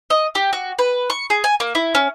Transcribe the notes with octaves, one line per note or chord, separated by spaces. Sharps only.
D#5
G4
F#4
B4
C#6
G#4
G#5
A#3
E4
C#4